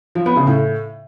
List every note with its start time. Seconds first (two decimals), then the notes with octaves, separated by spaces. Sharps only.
0.15 F3
0.26 B3
0.36 C#3
0.47 A2